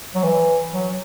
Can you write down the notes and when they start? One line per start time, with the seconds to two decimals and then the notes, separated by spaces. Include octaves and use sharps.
0.15 F#3
0.24 E3
0.72 F#3